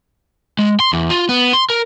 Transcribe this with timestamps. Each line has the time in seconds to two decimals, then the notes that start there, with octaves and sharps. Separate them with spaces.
0.59 G#3
0.80 C6
0.93 E2
1.10 F4
1.29 B3
1.53 C6
1.70 A#4